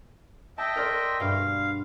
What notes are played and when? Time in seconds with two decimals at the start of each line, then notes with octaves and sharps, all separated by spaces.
0.58 D#5 E5 G5 A5
0.76 A#4 D5 C6
1.20 G2 B2 F5